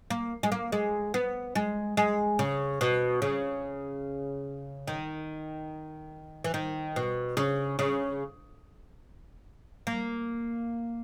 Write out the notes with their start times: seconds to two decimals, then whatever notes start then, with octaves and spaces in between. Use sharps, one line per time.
0.10 A#3
0.43 G#3
0.52 A#3
0.72 G#3
1.14 B3
1.55 G#3
1.97 G#3
2.39 C#3
2.81 B2
3.22 C#3
4.88 D#3
6.44 E3
6.54 D#3
6.96 B2
7.37 C#3
7.79 C#3
9.87 A#3